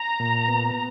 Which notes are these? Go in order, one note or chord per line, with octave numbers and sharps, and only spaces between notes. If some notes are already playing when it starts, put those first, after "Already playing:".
Already playing: A#5
A#2
B3